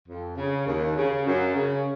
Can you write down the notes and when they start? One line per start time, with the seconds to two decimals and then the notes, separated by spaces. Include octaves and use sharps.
0.08 F2
0.37 C#3
0.67 D#2
0.96 C#3
1.27 F#2
1.56 C#3